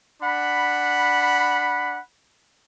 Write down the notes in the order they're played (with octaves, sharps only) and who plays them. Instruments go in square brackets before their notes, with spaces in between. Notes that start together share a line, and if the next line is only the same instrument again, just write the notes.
[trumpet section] D4 F#5 B5